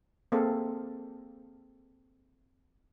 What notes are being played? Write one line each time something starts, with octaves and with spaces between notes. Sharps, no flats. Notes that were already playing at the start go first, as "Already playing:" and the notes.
A#3 C4 G#4 A4 F5